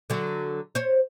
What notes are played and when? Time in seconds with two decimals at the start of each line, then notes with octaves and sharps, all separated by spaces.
0.10 D3 F#3
0.75 C5 C#5